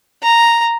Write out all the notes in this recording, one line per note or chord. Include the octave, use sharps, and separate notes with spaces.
A#5